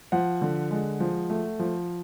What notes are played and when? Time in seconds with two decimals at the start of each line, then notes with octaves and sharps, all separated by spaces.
0.12 F3 F#5
0.42 D3
0.71 G#3
1.00 F3
1.30 A3
1.59 F3